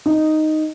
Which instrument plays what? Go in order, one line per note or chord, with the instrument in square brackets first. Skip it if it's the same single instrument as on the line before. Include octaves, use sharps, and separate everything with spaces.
[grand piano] D#4